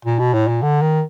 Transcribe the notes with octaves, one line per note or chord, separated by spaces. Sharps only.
A#2
B2
A2
A#2
D3
D#3